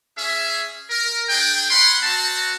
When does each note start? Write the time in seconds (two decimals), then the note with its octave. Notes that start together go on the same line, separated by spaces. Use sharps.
0.17 C#4 G#4 E5
0.90 A#4
1.29 D4 G#4 G5
1.69 C#4 F#5 B5 C6
2.02 C4 F#4 A5